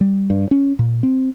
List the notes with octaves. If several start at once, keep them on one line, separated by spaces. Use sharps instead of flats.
G3
G2
C#4
A#2
C4